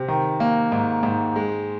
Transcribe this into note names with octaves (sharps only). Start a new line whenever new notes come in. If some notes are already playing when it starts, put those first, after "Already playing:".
Already playing: C3
D#3
A#3
G#2
G#2
G#3